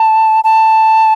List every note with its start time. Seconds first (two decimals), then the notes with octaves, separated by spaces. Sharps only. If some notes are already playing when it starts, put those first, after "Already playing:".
Already playing: A5
0.44 A5